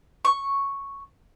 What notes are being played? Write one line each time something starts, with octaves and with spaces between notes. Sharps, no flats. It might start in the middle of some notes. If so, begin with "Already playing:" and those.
C#6